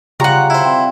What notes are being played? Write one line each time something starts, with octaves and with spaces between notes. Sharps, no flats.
C#3 G3 F4 F#5 A#5 C#6
E4 C5
C4